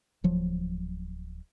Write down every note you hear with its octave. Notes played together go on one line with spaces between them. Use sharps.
D1 F3 F#3